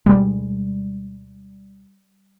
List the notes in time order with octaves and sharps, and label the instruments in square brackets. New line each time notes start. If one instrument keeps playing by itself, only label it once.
[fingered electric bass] D2 B2 G#3 [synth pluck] G3